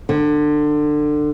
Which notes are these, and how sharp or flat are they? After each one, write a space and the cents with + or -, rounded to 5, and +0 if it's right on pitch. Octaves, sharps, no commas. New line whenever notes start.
D3 +25